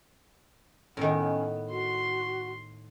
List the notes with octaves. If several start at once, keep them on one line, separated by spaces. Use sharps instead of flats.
A2 D#3 B3 C#4
F#4 C6